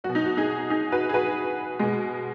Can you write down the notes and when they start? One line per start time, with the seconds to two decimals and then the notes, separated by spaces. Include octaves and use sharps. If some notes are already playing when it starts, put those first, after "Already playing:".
0.04 F#3 F#4
0.09 B2
0.15 D#4
0.26 F#4
0.37 D#4 G#4
0.70 D#4 G#4
0.92 F#4 B4
1.09 G#4
1.14 F#4 B4
1.79 B2 G#3